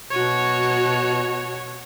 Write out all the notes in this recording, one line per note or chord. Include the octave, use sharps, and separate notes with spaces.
B2 F#4 C#5